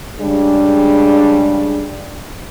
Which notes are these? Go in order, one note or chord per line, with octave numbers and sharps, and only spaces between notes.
C#3 G3 G#3 D4